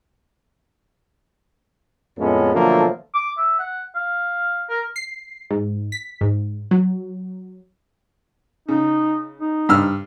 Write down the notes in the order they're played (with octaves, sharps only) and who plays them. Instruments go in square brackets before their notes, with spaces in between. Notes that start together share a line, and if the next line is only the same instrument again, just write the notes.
[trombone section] F2 A2 G#3 A3 B3 C#4
B2 D3 F3 F#3 A3 A#3
[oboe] D6
E5
F#5
F5
A#4
[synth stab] C7
G#2
B6
G#2
F#3
[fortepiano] C#3 [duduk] D#4
[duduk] D#4
[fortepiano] G2 E6 F6